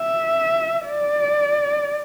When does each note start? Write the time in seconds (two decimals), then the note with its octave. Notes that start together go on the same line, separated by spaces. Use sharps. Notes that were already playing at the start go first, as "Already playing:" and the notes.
Already playing: E5
0.87 D5